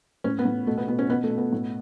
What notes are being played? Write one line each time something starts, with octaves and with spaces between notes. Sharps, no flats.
A2 C#4
B3
A2
B2 A3
B3
B2 B3
C#4
B2 B3
A3
B2
B3
A2